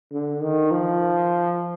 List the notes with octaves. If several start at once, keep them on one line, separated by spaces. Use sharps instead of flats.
D3
D#3
F3